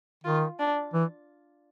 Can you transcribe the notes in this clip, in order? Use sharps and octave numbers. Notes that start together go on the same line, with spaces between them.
D#3 F4
D4
E3